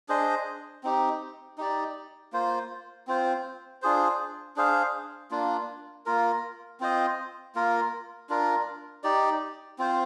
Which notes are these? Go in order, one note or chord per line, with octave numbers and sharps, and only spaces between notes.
D4 G#4 C5 D#5
C4 D#4 G4
D#4 G4 D5
A#3 F4 C5
C4 F4 C5
D4 F4 G#4 C5
D4 G#4 C5 F5
A#3 D4 F4
A#3 F4 A#4
C4 F4 C5 D#5
A#3 F4 A#4
D4 F4 A#4
D#4 G4 D5
C4 F4 C5